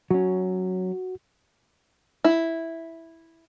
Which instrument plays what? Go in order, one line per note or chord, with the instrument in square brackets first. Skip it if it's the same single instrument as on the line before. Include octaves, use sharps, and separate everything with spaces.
[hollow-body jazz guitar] F#3 C#4 [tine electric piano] F#4
[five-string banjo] E4